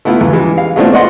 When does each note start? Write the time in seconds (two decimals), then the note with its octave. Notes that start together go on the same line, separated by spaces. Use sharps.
0.05 A3 B3 E4 F4
0.21 E2
0.33 E3 G3 G#3
0.58 F5
0.76 G#3 A3 B3 C4 D4 F4
0.93 D5 D#5 F#5 C6